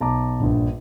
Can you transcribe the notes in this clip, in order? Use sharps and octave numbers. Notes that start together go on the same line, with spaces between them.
B1 A5 A#5 D6
A#1 G2